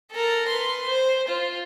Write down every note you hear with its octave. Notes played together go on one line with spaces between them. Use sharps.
A4 A#4
B4 C6
C5
F4